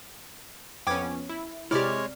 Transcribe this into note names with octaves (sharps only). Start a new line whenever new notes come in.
F2 B3 C#4 G5 D6 G#6
E4
C3 G#3 E4 G4 C#5 D5 F6